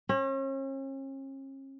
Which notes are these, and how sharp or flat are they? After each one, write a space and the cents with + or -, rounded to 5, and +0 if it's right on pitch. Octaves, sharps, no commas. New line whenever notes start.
C#4 -40